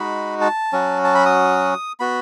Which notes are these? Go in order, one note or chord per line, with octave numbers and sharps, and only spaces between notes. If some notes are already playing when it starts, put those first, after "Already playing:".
Already playing: G#3 D#4 F#4 B5
A5
F#3 C#4 F#4
A5
B5
D#6
B3 F#4 B5